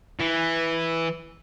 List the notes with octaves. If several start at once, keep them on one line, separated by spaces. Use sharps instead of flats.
E3